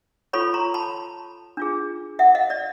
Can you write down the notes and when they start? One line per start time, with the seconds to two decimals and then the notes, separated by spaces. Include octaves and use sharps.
0.33 F4 A4 C#5 B5 C#6
0.54 A#5 C6
0.74 A5 B5
1.57 D4 F4 G#4
2.19 E5 F#5
2.35 D#5 F5
2.50 D5 E5